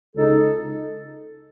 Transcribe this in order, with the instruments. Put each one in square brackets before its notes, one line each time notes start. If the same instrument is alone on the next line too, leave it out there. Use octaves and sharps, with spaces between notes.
[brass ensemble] C#2 C#3 G#3 D#4 [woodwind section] A4